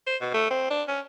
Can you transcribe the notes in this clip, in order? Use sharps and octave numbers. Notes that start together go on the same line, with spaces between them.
C5
B2
A3
C4
D4
C#4